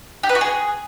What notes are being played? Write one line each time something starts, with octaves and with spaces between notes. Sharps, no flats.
G4
B4
F#4
G#4